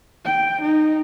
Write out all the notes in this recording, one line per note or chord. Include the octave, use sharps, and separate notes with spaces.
G5
D#4